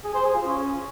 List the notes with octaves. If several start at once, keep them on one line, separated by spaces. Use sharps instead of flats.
G#4
C5
G#4
F4
C#4